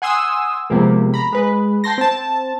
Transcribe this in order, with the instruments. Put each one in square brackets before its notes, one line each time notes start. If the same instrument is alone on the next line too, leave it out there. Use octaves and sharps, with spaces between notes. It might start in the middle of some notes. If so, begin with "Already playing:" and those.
[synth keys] F#5 G#5 C6 D#6 E6
C3 F3 G#3 A#3 B3
A#5 B5
G#3 B4
G5 A5 C6 A#6
C4 A5